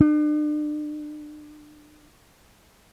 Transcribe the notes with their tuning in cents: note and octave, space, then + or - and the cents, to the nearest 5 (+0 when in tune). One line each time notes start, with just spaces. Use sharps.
D4 +40